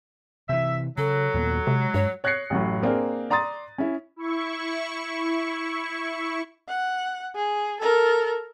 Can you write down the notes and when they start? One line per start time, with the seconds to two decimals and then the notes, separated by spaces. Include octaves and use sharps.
0.49 C3 E3 E5
0.98 C#3 F#3 A4
1.34 D#2 A#2 B3
1.67 C3 G#3
1.94 G2 C#5
2.24 C#5 F#6 G#6 A#6 C7 C#7
2.50 A1 F#2 A2
2.82 A#3 C4 D4 G#4 A#4
3.30 D5 A#5 C6 D#6 A6
3.78 C#4 E4
4.16 E4 C#6
6.68 F#5
7.35 G#4
7.80 A4 A#4